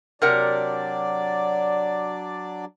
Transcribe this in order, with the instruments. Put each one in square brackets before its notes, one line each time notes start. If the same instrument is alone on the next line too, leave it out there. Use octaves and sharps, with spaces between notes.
[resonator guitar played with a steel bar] C3 A#4 F#5 [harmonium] F#3 D4 D5